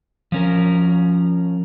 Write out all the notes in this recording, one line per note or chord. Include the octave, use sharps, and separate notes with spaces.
F3 C#4 A#4